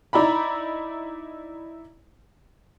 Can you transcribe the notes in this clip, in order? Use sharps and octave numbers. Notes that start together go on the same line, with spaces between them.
D#4 E4 D5 A#5 B5